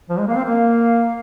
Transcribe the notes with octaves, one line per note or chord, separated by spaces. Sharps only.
F3 C5
G#3
A#3 F5
C4
A#3 F5